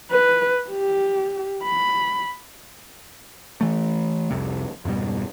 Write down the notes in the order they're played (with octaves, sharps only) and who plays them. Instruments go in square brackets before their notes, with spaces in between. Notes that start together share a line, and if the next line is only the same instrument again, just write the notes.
[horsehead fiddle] B4
G4
B5
[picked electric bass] E3 A3
C2 F2 C3
F2 G#2 B2 G3